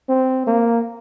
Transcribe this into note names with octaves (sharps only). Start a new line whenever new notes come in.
C4
A#3